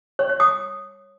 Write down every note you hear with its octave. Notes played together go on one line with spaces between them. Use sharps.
C#5
C#5
D#6